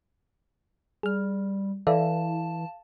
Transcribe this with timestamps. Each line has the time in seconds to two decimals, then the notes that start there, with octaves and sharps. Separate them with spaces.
1.03 G3 G#4 F6
1.87 E3 A4 D5 E5 F5 A5